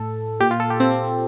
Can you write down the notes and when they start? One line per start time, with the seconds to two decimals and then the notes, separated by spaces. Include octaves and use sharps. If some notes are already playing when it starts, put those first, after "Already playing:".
Already playing: A2 A4
0.40 A#2 G4
0.51 F4
0.60 A4
0.70 G4
0.80 C4